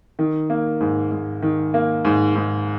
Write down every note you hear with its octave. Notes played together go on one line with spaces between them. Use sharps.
D#3
A#3
G#2
G#2
D#3
A#3
G#2
G#2